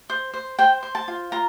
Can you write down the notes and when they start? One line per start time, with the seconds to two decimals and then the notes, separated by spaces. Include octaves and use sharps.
0.10 C5
0.34 C5
0.59 C5 G5
0.83 C5
0.95 A5
1.08 F4
1.32 F4 A#5